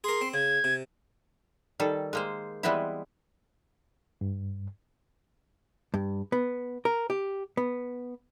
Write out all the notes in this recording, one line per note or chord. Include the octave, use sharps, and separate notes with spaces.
G#4 A#4 C6
C4
C#3 G#6
C3
D#3 G3 A4
G#3 A#3 C5
E3 G3 G#3 B3 C4 E4
G2
G2
B3
A#4
G4
B3